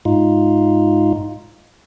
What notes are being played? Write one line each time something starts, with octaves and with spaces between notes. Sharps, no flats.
G#2 D#4 F4